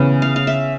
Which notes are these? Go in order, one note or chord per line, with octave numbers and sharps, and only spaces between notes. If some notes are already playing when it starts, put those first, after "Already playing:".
Already playing: C#3 E3 B3
F5
F5
E5